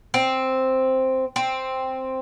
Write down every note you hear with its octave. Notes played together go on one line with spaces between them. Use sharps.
C4
C4